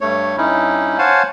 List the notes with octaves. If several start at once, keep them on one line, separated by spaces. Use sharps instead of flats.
G2 A3 C#5
G2 C#4 D#4 E4
C5 C#5 F5 F#5 G#5 A5